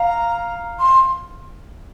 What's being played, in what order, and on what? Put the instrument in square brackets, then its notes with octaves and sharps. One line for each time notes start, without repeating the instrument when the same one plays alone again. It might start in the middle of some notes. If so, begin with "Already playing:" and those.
Already playing: [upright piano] F5 [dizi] A#5
[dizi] C6